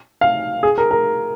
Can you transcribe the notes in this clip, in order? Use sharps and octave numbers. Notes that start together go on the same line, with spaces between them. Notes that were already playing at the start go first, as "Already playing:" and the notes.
F5
G#4
A#4
A#4